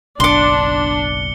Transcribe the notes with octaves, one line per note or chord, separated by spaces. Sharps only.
F#1 B1 D4 C6 D6 C#7 G7